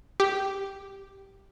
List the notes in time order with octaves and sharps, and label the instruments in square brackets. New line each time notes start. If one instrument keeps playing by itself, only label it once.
[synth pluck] G4